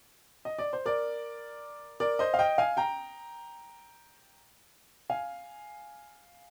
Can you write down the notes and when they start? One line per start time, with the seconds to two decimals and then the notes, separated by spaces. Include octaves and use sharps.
0.45 D#5
0.59 D5
0.73 C5
0.86 A#4 D5
2.00 A#4 D5
2.19 C5 D#5
2.34 F5
2.39 D#5 G5
2.58 F5 G#5
2.77 G5 A#5
5.10 F5 G#5